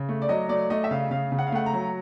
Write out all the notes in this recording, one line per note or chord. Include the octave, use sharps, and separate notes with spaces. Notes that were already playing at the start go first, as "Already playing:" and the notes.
Already playing: C#3
A3
D5
F#3 D#5
A3 D5
A3 D#5
E5
C#3 F5
C#3 F5
C#3
F#5
F5
A3 F#5
A#5
F#3